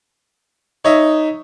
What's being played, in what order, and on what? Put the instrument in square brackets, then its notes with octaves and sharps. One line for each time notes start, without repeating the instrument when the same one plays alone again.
[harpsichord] D#4 [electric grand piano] C#5 D#5 E5